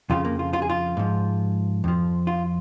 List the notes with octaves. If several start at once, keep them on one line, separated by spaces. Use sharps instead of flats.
F2 C#3 F3 F4
A#3
F4
F4
G#4
F4
G#2 F3
F2 F3
F4